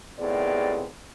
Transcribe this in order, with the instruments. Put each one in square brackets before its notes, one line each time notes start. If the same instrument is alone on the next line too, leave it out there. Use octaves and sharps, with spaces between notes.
[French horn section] D#2 A2 C3 B3 G#4 D5